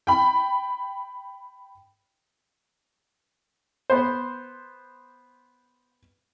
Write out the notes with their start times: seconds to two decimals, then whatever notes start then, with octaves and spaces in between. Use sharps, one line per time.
0.07 G5 B5
3.90 B3 C5